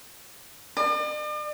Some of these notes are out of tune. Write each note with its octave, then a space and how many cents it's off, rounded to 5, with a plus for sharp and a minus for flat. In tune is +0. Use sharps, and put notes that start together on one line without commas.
D5 +45